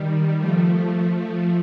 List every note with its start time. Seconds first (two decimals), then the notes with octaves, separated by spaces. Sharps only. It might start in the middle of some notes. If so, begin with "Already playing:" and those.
Already playing: D#3 G3
0.37 F3 A3